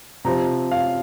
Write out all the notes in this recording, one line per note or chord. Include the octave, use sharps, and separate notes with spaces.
C3 F3 C4 A#5
F5